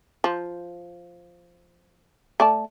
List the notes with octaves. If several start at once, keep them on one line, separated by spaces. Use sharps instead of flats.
F3
A3 D5 A5